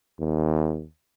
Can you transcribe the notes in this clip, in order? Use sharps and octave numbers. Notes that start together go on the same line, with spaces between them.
D#2